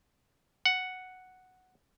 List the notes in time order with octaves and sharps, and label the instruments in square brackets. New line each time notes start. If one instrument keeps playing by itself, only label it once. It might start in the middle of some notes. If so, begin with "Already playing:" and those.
[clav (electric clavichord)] F#5